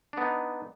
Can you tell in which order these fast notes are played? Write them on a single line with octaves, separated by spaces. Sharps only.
D4 B3 D#4